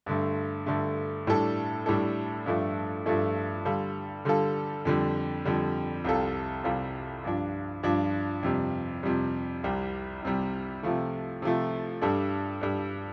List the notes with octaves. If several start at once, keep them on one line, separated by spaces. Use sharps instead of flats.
G2 D3 A3
G2 D3 A3
A2 G3 D4 A4
A2 G3 D4 A4
G2 F3 A3 D4 A4
G2 F3 A3 D4 A4
D3 G3 F4 A4
D3 G3 F4 A4
F2 D3 G3
F2 D3 G3
C2 C3 G3 F4 A4
C2 C3 G3 F4 A4
G2 F3 D4
G2 F3 D4
F2 C3 G3
F2 C3 G3
C2 C3 G3
C2 C3 G3
C3 F3 A3
C3 F3 A3
G2 G3 D4 A4
G2 G3 D4 A4